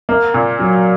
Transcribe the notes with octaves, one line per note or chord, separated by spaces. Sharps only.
A#3
A#2
F#3